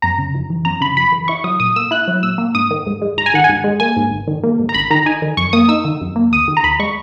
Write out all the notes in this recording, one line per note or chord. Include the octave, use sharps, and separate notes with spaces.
F#2 A#5
C#3
F#2
E3
F#2 A#5
C#3 B5
F#2 B5
E3
E4 C#6
F#3 D#6
A#2 D#6
A#3 E6
E4 F#6
F#3
A#2 E6
A#3
G#2 D#6
D#3
G#2
G#3
G#2 A#5
G#5
D#3 F#5
G#5
G#2
G#3
A#3 G#5
G#2
G#1
D#3
A#3
G#2
A#5
G#1 B5
D#3 A#5
D#4 G#5
D#3
F#2 C#6
A#3 D#6
D#4 E6
D#3
F#2
A#3
D#2 D#6
D#3
A#5
D#2 B5
G#3 C#6